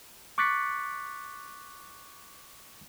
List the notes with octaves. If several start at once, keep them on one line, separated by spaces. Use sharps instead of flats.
C#6 D6 F#6 A6 B6 C#7